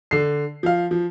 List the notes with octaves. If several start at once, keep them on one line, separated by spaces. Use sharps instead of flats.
D3 C7
F3 F5
F3